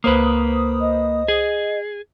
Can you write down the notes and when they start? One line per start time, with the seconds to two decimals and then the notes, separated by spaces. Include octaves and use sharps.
0.04 C#2 A#3 B4 C5 D#6
0.81 D#5
1.28 G#4